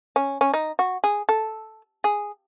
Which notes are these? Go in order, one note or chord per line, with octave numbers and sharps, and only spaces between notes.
C#4
C#4
D#4
F#4
G#4
A4
G#4